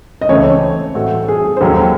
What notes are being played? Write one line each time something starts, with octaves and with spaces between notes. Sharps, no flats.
D#5
C#2 C#3 E3 A3 C4 C#5
A2 E3 C4 F#4 A4
G#4
C5
D#2 D#3 F#3 C#4 A4